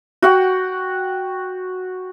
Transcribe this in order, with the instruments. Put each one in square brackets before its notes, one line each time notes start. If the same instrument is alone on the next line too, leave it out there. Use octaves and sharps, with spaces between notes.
[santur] F#4 F#5 G5